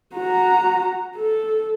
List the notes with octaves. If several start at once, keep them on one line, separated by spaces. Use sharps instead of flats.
F#4 A#5
A4